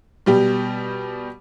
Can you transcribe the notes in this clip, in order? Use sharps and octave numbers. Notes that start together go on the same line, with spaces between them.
B2 G3 G4